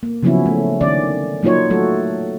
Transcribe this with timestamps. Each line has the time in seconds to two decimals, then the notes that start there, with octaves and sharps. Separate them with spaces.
0.03 A#3
0.23 C#3 F3 F#3 B3 C#4 E4
0.46 A3
0.81 D3 D#3 C#4 D5
1.43 F#3 A#3 D#4 F4 C#5
1.70 F#3 A3 F#4 A4